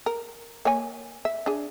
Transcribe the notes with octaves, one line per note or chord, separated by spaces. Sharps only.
A#4
A#3 C#5 G#5
E5
D4 G#4